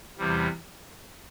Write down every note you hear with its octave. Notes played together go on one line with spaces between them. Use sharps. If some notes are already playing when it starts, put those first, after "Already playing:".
E2 C3 E3 G3